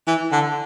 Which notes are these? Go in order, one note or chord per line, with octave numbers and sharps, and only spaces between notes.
E3
D3